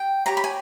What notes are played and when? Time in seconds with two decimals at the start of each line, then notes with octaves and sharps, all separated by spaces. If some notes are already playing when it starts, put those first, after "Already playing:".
Already playing: G5
0.26 G4 C#5 A#5
0.37 B5
0.44 G#5